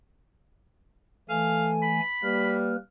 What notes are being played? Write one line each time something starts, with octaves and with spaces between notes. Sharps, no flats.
E3 A3 A4 F5 G#5
B5
G3 A#3 B4 F6